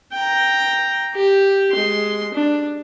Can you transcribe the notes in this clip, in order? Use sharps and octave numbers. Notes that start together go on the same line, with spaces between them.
G5 A#5
G4
G#3 C6
D4